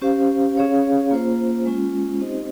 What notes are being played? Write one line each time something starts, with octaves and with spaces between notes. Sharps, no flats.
C#4 G4 C5 F5
C#4 G#4 C#5 F5
A#3 F4 C5
G#3 C#4 F4
C4 D#4 G4 C5 D#5